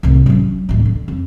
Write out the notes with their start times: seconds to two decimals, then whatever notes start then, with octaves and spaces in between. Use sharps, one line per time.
0.03 C2 A2
0.26 F#3 C#4
0.69 A1 D2
0.86 D3
1.08 F2